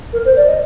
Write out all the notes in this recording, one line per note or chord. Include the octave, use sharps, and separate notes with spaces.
A#4
C5
D5
D#5